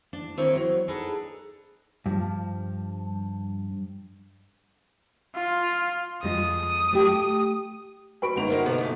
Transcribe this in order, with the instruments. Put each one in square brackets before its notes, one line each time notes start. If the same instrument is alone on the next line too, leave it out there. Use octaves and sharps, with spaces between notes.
[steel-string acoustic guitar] D4
D#3 A#3 C4 E4 C#5
F#3
D4 D#4 G#4 A4 B4
[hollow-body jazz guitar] G2 F3
[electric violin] F4
[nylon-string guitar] F2 G#3 F4 [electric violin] D#6
[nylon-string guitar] A3 G4
[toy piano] F#4 B4 G5 [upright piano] B5 C#6 D7
[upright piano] G1 G#2 F7 [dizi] F#5
[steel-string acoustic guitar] D#4 A#4 C5
[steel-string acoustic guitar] B2 B3 D#4 [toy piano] A4 C6
[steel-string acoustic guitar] E3 A3